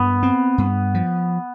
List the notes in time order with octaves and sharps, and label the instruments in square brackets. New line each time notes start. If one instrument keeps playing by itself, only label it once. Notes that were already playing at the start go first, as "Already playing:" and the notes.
Already playing: [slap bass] G2 [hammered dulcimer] B3
[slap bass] C4
G2
F3